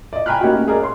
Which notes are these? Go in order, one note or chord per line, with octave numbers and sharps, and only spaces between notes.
D5 D#5
G5 G#5 A#5 B5 F6 F#6
A3 A#3 C#4 D#4 F#4 G4
G#4 A#4 D5 D#5
C#5 C6